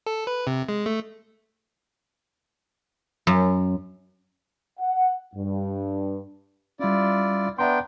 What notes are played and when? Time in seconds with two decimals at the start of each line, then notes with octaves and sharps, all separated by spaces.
0.06 A4
0.27 B4
0.47 C3
0.69 G#3
0.86 A3
3.27 F#2
4.79 F#5
5.35 G2
6.80 G3 C#4 E4 F4 D5
7.59 B3 D4 E5 G5 A#5 C6